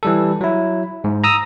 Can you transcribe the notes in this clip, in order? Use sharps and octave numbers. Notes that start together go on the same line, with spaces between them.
E3 G3 A4
F#3 E4
G#2
A#5 D#6 E6